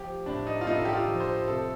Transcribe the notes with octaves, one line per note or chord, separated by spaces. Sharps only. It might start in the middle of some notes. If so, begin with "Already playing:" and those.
Already playing: F3 G4
A2 D4
D#4
F4
A2 D#4
A4
G4
F4
F3
C5
C3 A4